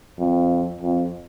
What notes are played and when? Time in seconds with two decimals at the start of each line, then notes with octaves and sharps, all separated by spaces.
0.18 F2
0.81 F2